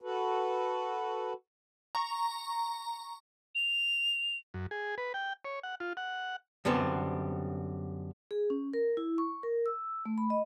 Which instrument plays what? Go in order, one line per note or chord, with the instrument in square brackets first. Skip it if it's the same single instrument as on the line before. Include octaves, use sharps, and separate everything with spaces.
[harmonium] F#4 A4 B4
[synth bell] A#5 C#6
[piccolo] F7
[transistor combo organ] F#2
G#4
B4
G5
C#5
F#5
F4
F#5
[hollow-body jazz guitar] F#2 D3 G3 B3 C4
[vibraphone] G#4
C#4
A#4
E4
C#6
A#4
E6
A3
B5
D#5